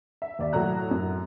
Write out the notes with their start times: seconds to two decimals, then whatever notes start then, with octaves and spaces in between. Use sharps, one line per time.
0.22 E5
0.39 D#2 D5 E5
0.53 A2 F#3 F#4 A#5 F#6
0.91 F#2